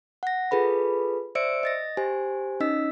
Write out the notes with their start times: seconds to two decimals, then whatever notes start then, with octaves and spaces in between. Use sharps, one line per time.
0.23 F#5 A#6
0.51 F4 G#4 A4 B4 B5
1.35 C5 D5 E5 E6 C#7 D7
1.63 D#5 A6 A#6
1.97 G4 C5 G#5
2.60 C#4 D#4 D#5 E6 B6